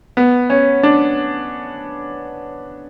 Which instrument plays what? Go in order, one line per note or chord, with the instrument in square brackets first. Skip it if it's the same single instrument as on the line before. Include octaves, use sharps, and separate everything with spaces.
[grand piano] B3
C#4
D4